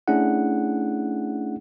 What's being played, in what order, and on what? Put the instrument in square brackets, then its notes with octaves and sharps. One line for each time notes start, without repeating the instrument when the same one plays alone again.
[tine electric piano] A3 C#4 D4 E4 G#4 F#5